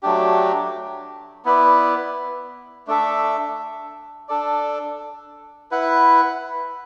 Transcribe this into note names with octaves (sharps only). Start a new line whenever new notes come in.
F#3 A3 D4 G4
B3 E4 B4 D5
A3 D4 A4 E5
D4 A4 D5
E4 B4 F#5